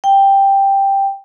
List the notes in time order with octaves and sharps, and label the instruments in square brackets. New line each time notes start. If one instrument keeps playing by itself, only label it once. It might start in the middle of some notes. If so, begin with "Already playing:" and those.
[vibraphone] G5